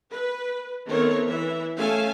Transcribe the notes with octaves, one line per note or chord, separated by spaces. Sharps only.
B4
D#3 A3 B3 C4 A#4 C#5
E3 E5
A3 C#4 C#5 F5 G#5 A5